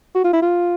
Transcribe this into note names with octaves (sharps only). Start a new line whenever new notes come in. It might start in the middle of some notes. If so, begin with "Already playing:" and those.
F#4
F4
E4
F4